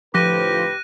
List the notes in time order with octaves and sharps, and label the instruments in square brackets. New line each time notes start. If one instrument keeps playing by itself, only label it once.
[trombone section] A2 D3 B4 [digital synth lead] F3 [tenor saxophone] G4 [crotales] F#6 A#6 D#7